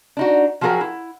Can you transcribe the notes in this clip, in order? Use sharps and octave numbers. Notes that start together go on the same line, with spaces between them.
D4 D#4 F#4
F3 F#3 F#4 G#4 A#4 G5
E4